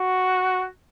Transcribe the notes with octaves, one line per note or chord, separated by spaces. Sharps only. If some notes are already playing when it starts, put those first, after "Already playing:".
Already playing: F#4